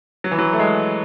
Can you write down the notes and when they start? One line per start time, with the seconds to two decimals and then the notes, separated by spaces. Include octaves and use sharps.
0.24 F#3
0.31 E3
0.38 F#3
0.53 A3
0.59 G#3